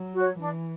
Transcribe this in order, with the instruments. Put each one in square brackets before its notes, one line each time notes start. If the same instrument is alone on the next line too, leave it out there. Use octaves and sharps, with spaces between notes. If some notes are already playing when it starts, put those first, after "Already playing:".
Already playing: [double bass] F#3
[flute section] F#4 C#5
[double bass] E3 [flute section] D4